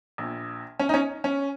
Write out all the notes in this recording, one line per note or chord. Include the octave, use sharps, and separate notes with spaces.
A#1 A#2
C#4
D#4
C#4
C#4